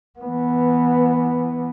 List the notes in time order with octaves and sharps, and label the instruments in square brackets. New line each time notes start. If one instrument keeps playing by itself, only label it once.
[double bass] E3 B3